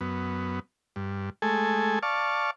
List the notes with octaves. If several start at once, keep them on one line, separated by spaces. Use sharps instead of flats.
F#2 B3
G2
G#3 A3 A4 G#5
D5 F5 A5 C#6